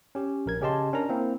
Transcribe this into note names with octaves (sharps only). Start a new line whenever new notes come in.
C#4 G4
A#1 A#4 G#6
C#3 C#4 G4 D#5 A5 C6
C#4 D4 A#4 A#5
A#3 C4 E4